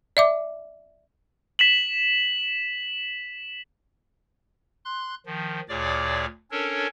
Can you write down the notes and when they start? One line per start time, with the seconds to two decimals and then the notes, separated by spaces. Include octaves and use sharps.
0.17 D5 E5 D6
1.59 B6 E7 F#7
4.85 C6 F#6
5.26 D#3 F3
5.69 D2 A#2 G#4 C#5 D5 D6
6.51 C#4 D4 A4 A#4 C#5